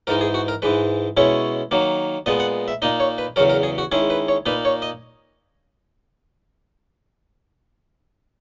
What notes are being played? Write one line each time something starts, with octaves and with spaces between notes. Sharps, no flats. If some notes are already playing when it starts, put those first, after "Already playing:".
G#2 E3 G#3 D#4 A#4
G#4
F#4
A#4
G#2 E3 G#3 B4
B2 G#3 C#4 E4 C#5
D#3 F#3 A#3
A#2 G#3 B3 D#5
F#5
E5
A#2 A#3 D#4 D#5
C#5
B4
E2 C#3 F#3 C#4 A#4
A#4
G#4
F#4
D#3 G#3 C#4 E4 G#4
B4
C#5
A#2 A#3 D#4 B4
C#5
D#5